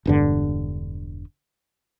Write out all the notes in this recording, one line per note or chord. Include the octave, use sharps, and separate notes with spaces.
E1 G2 D3